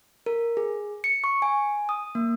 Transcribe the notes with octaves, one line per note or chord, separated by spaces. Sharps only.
A#4
G#4
C#7
C#6
G#5
D#6
A#3